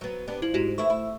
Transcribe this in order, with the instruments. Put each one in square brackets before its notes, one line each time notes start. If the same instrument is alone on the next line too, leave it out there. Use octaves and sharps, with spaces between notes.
[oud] F#3 B3
B3 D4 G4
[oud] F3 [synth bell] E4 F#7
[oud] G#2 [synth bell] E4 F#4 G4
[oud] E3 A3 E4 [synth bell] C5 C#6
[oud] E4